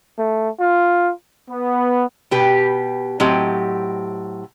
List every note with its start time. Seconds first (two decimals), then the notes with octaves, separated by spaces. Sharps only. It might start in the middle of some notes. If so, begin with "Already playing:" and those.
0.18 A3
0.60 F4
1.50 B3
2.31 B2 G4 B4
3.20 A2 F#3 C4 G4 D#5